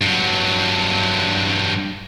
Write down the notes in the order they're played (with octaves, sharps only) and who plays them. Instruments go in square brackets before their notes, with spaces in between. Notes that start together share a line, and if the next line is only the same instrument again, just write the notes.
[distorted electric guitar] G2 F#3